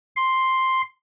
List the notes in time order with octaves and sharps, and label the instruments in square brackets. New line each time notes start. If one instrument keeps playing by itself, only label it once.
[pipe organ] C6